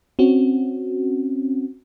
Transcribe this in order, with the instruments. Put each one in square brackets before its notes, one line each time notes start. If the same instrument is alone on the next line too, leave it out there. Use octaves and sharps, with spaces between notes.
[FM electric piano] C4 C#4 F#4